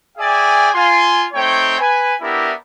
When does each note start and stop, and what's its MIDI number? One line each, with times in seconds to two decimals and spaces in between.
0.18 0.68 68
0.18 0.68 74
0.18 0.68 76
0.18 0.68 79
0.18 0.68 80
0.72 1.26 65
0.72 1.26 80
0.72 1.26 84
1.33 1.75 57
1.33 1.75 60
1.33 1.75 63
1.33 1.75 73
1.33 1.75 79
1.79 2.14 71
1.79 2.14 80
2.21 2.51 59
2.21 2.51 62
2.21 2.51 64
2.21 2.51 67
2.21 2.51 70
2.21 2.51 76